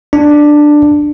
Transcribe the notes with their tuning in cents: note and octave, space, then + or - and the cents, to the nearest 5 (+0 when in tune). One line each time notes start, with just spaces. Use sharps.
D4 +10